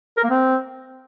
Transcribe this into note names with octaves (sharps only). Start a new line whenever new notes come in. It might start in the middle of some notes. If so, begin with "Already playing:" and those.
A#4
A#3
C4